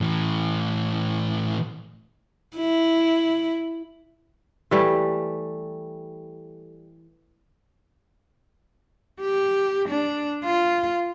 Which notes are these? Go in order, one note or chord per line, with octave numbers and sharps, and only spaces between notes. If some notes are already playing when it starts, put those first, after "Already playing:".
A2 E3
E4
E3 G3 A3
G4
D4
F4